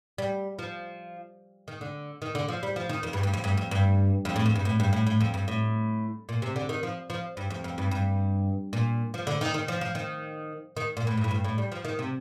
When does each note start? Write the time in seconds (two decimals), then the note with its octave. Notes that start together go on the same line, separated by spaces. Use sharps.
0.18 G3
0.59 F3
1.68 D#3
1.81 D3
2.22 D#3
2.35 D3
2.48 F3
2.63 G3
2.76 F3
2.89 D#3
3.03 F2
3.13 G2
3.23 G2
3.34 F2
3.44 G2
3.57 F2
3.71 G2
4.25 F2
4.36 A2
4.46 F2
4.56 G2
4.65 A2
4.80 G2
4.93 A2
5.07 A2
5.20 F2
5.34 G2
5.48 A2
6.29 A#2
6.42 C3
6.56 D3
6.69 D#3
6.83 F3
7.10 F3
7.37 G2
7.50 F2
7.64 F2
7.78 G2
7.91 G2
8.73 A#2
9.14 F3
9.27 D3
9.41 D#3
9.54 D#3
9.68 F3
9.81 F3
9.95 D#3
10.77 D#3
10.97 A#2
11.07 A2
11.17 G2
11.24 A2
11.31 G2
11.44 A2
11.58 G3
11.72 F3
11.85 D#3
11.99 C3